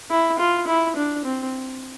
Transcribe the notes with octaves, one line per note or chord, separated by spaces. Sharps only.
E4
F4
E4
D4
C4